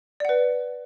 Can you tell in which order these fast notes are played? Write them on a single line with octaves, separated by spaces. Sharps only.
D5 F#5 B4